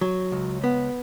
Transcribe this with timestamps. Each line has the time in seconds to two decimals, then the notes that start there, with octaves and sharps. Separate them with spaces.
0.01 F#3
0.32 C#2
0.64 B3